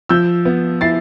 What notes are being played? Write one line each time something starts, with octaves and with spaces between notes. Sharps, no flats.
F3 E6 G6
B3
E4 A6 C7